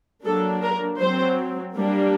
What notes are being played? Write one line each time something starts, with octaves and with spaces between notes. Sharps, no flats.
F#3 A#3 D4 A4
A#4
F#3 C4 C5
G3 A#3 D4